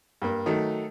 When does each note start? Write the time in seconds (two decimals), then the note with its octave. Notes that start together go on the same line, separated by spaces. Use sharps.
0.22 G2 A#3
0.46 D#3 F#3 A3